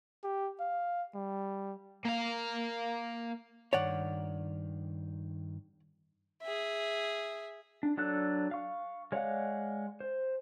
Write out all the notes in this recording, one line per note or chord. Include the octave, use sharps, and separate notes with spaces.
G4
F5
G3
A#3 F5
G2 D#3 C#5 D5 F#5
G#4 E5
D4
F#3 D4 A4 F#6
F5 C#6
G#3 C#5 D5 F5 F#5
C5